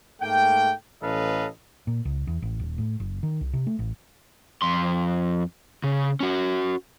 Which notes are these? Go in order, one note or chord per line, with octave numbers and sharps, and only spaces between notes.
G#2 A3 A#3 G5
A1 C#4 A4 B4 D#5 F5
A#2
C#2
E2
A1
D#1
A2
F#1
D#3
C2
C3
A3
A1
F2 C6
C#3
C#4 F#4